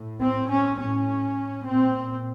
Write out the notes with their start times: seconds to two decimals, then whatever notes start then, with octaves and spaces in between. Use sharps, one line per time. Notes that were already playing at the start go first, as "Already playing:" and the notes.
Already playing: A2
0.21 C4
0.49 C#4
0.78 A2 C#4
1.65 A#2 C4